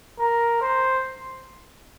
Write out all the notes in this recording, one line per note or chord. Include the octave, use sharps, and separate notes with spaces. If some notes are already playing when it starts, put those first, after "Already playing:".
A#4
C5